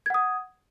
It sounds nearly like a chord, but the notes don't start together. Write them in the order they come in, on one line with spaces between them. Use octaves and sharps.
G#6 F#5 D#6